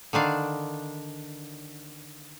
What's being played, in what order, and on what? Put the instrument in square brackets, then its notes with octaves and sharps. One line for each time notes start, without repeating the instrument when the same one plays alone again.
[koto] D3 D#3 D4 F5